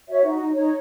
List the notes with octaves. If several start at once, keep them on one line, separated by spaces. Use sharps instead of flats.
F#4 C#5 E5
D#4
D#5
D#4
C#5
D#4